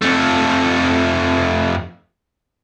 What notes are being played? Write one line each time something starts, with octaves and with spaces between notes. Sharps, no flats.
F2 A3